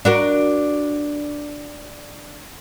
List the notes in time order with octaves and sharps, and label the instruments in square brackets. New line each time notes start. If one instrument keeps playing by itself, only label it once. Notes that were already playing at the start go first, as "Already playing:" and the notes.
[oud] D4 F#4 A#4